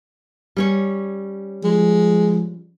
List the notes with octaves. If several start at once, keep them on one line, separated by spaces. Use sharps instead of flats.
G3 C#4 C#5
F3 G#3